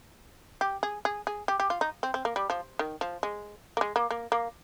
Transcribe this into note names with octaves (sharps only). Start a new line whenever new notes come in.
G4
G#4
G#4
G#4
G4
G4
F4
D#4
C4
C4
A#3
G3
F3
D#3
F3
G#3
A#3
G#3
A#3
A#3
A#3